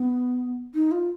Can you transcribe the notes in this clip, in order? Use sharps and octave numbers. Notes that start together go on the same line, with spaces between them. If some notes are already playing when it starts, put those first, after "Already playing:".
Already playing: B3
D#4
F4